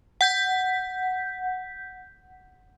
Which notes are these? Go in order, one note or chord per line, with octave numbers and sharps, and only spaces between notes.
F#5 G6 B6